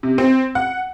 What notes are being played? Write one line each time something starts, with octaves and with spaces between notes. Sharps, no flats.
C3
C4
F#5